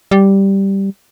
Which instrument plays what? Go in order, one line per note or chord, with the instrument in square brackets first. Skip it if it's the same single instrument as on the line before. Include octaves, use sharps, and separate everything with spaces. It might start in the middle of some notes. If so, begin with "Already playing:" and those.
[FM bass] G3